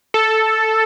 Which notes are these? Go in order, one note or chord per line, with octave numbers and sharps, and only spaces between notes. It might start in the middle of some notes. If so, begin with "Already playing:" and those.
A4